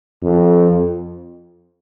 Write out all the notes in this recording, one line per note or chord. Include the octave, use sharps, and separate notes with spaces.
F2